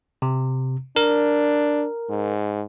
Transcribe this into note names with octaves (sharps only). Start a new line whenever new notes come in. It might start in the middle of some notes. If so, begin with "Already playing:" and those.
C3
D4 A#4
G#2